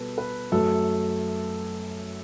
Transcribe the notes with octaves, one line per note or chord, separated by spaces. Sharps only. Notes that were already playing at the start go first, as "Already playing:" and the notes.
Already playing: B2 G3 B3 A4 B4
B4
F#2 F#3 A3 A4